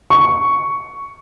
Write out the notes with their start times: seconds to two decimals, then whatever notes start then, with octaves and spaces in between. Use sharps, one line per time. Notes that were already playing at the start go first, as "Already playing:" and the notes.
0.10 C#6